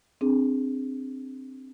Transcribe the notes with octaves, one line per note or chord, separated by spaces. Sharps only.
C4 D4 G#4